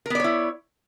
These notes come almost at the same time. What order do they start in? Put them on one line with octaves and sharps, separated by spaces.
A#4 B3 D5 C#5 E4